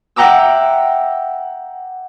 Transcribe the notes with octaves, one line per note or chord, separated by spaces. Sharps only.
E5 F#5 G5 A#5 D6 E6